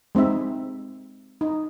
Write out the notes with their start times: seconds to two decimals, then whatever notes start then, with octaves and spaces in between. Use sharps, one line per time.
0.15 G#3 C4 D#4 E5
1.41 D#4